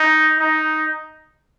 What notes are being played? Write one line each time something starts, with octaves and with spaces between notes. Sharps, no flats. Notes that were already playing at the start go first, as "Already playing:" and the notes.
Already playing: D#4
D#4